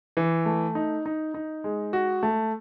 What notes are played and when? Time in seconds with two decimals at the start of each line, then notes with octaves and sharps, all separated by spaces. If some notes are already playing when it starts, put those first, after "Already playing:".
0.17 E3
0.46 A3
0.75 D#4
1.06 D#4
1.34 D#4
1.64 G#3
1.93 F#4
2.23 A3